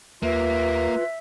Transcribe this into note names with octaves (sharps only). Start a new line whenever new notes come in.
D#2 A#3 F4 B4 E5